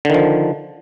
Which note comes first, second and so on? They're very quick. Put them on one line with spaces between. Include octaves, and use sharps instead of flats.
D3 D#3 F3